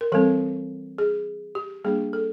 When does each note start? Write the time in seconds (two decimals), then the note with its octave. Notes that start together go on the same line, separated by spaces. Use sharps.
0.01 A#4
0.12 E3 G3 C4 A4
0.98 G#4
1.55 G4
1.84 G3 A#3 D4 G#4
2.13 A4